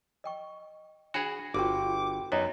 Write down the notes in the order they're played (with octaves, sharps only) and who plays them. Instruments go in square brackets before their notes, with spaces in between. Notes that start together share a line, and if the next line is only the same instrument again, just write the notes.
[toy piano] D#5 G5 C#6
[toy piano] D4 G#5 B5 [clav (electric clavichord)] F#4 G#4
[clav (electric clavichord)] G1 [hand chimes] F4 F#4 G5 [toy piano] F5 A5 C#6 [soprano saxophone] D6
[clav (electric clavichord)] F#2 B3 [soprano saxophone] D#4 [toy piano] C#5 D5 A#5